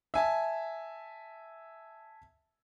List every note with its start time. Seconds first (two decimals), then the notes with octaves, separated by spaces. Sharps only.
0.14 E5 G#5 A5